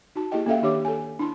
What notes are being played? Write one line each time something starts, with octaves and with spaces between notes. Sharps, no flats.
D#4 F#4 A5
A#3 E4 G4 G#4 D#5 G5
A#3 C#4 A4 E5 F5 G5
D#3 D4 G4 C#5 D6
A4 G#5
D4 E4 A5 C6